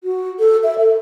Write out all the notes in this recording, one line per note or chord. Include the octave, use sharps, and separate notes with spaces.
F#4
A4
E5
A4